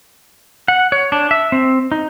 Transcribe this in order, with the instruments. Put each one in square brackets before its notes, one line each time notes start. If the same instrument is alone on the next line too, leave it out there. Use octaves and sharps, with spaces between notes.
[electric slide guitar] F#5
C#5
D4
E5
C4
D#4